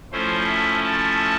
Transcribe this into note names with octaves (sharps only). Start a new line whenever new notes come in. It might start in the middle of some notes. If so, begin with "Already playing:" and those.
F3 A3 C#4 E4 C5
E5
A5